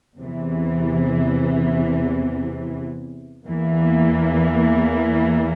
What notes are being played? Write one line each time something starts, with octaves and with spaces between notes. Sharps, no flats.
E2 C3 E3
E2 E3 A#3